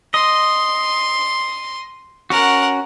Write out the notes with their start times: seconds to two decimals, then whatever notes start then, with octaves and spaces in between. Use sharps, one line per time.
0.14 D#5 C6
2.30 C#4 F#4 A#4 F#5